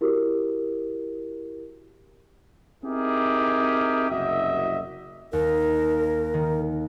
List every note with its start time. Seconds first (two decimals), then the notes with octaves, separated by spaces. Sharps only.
0.01 E4 F#4 G4 A#4
2.84 C4 D#4 E4 G4 G#4 A#4
4.10 F#1 C2 F#4 D#5 E5
5.33 D#2 A#4
6.34 D#3